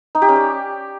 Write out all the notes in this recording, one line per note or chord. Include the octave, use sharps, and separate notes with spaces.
D#4
G4
C#4
D5